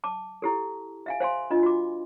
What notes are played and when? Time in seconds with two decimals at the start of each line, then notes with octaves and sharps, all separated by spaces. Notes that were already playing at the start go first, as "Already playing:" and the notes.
0.04 A5 D6
0.42 E4 G4 A4
1.06 E5 F5 G#5
1.20 C5 F5 G#5 C6
1.51 D4 F4 D#5
1.63 F#4 D6